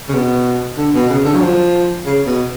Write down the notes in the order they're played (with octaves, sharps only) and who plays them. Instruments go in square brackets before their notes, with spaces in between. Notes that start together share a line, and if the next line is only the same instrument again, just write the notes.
[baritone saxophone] C#3
B2
D3
B2
C#3
D3
F#3
F3
C#3
B2